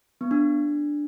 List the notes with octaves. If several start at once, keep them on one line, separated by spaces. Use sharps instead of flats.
B3
D4